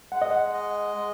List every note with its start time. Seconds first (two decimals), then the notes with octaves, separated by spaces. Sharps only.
0.12 G#3 F#5
0.22 D#5
0.31 F#5
0.54 D#5
0.97 G#3